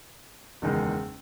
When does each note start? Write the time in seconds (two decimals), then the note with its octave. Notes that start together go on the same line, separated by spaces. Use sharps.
0.62 F#1 E2 D#3 G#3 D#4